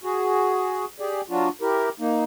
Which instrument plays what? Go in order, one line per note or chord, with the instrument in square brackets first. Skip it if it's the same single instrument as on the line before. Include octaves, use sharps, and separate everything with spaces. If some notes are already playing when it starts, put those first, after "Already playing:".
[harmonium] F#4 G#4
G4 G#4 D5
F#3 D4 F4 F#4
E4 G4 A#4
A#3 D#4